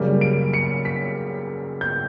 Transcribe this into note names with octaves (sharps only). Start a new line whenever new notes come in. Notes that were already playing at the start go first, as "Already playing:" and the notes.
Already playing: F#2 C#3 G3 A#3
D7
C#7
B6
G6